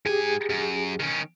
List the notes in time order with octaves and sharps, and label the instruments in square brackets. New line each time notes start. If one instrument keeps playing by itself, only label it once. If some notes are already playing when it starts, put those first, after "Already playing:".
[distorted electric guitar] G#2 G#5 [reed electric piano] G4 G#4
[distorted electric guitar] F#2
D#3 C#4